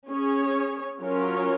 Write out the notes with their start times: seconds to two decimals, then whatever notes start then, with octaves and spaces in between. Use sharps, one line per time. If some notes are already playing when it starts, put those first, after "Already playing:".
0.08 C#4 G#4 C#5
1.00 F#3 C#4 F4 A#4 C#5